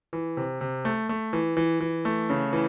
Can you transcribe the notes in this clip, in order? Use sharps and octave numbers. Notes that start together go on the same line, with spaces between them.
E3
C3
C3
A3
A3
E3
E3
E3
A3
C#3
E3